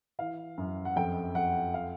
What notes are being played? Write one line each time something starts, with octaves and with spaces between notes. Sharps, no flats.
E3 F5
F#2
F#5
F2 G5
F2 F#5
F5